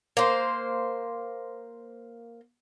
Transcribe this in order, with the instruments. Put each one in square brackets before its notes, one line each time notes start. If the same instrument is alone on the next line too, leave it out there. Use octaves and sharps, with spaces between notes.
[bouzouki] A#3 C5